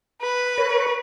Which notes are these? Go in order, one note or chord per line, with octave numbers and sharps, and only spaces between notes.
B4
A#4 C#5